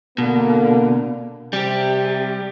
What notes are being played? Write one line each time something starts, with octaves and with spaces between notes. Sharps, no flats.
B2 D3 A#3
C3 G3 G4